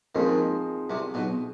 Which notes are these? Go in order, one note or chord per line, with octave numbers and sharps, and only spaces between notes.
D#2 D#3 F3 G#3 C4 D#4
C2 C3
B1 B2